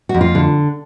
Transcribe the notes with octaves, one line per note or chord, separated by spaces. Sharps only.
F#4
F2
F4
D3